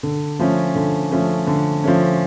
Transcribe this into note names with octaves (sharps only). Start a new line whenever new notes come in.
D3
F3 A3 C#4
D3
F3 A3 C#4
D3
F3 A3 C#4